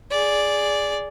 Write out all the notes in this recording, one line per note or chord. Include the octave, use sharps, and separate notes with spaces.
G#4 D5